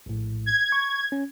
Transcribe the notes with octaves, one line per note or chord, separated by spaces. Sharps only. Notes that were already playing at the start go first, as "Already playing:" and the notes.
A#1 A2
G#6
C#6
C#4